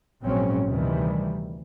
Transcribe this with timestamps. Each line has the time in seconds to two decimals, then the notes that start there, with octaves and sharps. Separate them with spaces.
0.23 A#1 G#2 C#3 F#3 C4 C#4
0.66 D2 C3 D#3 E3 G3